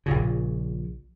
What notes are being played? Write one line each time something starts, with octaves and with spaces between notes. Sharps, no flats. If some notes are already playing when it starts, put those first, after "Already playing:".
A#1 A#2 C#3